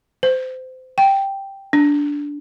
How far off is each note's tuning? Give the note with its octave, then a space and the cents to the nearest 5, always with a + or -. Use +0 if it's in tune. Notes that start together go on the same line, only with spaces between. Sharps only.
C5 -25
G5 +0
D4 -15